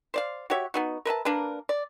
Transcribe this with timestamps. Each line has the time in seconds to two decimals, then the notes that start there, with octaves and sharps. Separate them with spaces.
0.14 C5 D5 F5
0.50 F#4 G4 C#5 E5
0.74 B3 D#4 F#4
1.05 A#4 B4 E5 A5
1.25 A#3 D4 A#4 B4
1.69 D5